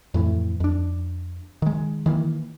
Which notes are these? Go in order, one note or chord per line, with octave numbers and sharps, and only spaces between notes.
F2 A2 E3
F2 D4
D#3 G#3
D#3 E3 A#3